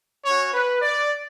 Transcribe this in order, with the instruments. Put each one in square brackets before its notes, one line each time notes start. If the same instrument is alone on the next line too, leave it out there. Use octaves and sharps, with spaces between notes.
[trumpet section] C#4 F#4 C#5
B4
D5